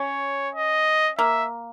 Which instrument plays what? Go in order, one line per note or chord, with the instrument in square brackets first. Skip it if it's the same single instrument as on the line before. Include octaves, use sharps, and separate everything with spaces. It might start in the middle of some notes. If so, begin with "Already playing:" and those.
Already playing: [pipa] C#4 [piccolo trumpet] C#5
[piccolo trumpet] D#5
[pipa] A#3 [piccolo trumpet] E5